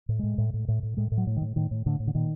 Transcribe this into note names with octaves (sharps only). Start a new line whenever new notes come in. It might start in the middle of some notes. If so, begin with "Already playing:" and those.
A2
A2 G#3
A2
A2
A2
A2
A2 G#3
A2
F#3
A2
D#3
A2
A2 D#3
A2
A2 D3
A2
D3
A#2 D#3